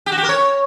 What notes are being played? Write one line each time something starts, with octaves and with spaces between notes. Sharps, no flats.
G4
F#4
G4
A#4
C#5